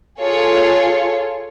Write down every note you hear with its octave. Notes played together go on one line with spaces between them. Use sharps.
F4 G#4 A4 C#5